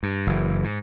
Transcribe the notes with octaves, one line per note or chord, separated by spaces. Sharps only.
G2
F#1 E3
G#2